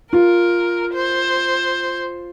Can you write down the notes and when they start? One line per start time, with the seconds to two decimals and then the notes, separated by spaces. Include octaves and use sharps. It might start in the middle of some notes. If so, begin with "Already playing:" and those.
0.13 F4 A#4
0.94 C5